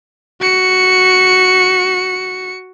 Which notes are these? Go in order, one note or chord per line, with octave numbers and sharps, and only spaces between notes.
F#4 C#7